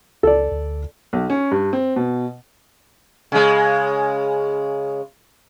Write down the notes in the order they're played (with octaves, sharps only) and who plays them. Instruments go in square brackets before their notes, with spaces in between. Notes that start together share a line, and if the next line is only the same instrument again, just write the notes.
[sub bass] C#2 [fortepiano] A4 D5
[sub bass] D2
[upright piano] B1
C#4
G2
C4
B2
[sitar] C#3 G#3